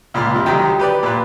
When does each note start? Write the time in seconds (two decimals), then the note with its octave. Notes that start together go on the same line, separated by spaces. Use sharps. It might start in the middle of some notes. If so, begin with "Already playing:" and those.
0.14 C#2 A#2 B5 F6
0.34 F2 C3
0.46 D2 D#3 F#3 G3 D#4 G5
0.79 G4 B4 D5
1.03 A#2 B4